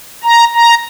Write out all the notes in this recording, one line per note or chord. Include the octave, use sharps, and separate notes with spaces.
A#5
A#5